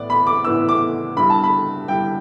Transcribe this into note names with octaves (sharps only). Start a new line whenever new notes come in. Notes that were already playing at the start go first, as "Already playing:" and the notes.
Already playing: A2 E3 B3 E4 D5
B5
D6
A2 E3 B3 E4 E6
D6
G2 G3 E4 B5
A5
B5
G2 G3 E4 G5